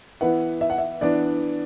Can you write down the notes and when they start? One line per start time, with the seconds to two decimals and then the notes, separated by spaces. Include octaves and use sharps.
0.21 E3 B3 E4 B4 F#5
0.61 E5
0.70 F#5
0.78 E5
1.01 E3 B3 D4 D5